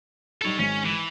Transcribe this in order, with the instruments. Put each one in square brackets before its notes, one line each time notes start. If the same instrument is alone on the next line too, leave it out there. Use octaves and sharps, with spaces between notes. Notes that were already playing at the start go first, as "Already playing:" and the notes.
[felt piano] G3 D#4 C#7 [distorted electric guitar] A4 C#5
[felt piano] G#1 G#3 B6 [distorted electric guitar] C#4
[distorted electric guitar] E3